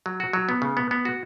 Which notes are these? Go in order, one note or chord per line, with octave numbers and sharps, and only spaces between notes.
F#3
F#4
F#3
B3
C#3
B3
B3
F#4